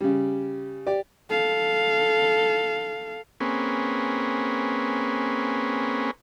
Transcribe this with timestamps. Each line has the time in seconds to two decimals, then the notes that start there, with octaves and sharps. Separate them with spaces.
0.01 C#3 G3
0.87 G4 D5
1.29 A4 F5
3.40 A#3 C4 C#4 G#4 B4